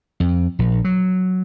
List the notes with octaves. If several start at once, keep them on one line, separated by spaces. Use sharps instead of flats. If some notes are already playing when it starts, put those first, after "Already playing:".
F2
A#1
F#3